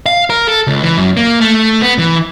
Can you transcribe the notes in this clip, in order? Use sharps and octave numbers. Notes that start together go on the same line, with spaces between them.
F5
A#4
A4
C#2
E3
F#2
A#3
A3
B3
E3